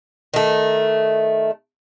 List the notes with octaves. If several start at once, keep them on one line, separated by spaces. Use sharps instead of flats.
D#3 A3